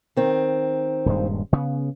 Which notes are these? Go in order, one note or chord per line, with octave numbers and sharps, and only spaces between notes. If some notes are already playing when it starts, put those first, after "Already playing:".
D#3 C4
D#1 G2 G#3
C#3 B3